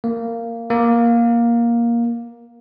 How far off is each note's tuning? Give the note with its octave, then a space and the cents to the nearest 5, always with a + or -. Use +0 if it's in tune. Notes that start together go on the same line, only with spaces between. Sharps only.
A#3 -15
A#3 +10